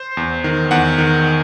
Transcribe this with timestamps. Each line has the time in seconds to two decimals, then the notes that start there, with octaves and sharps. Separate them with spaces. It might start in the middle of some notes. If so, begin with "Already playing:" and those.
Already playing: C5
0.17 E2
0.44 D#3
0.71 E2 F#5
0.98 D#3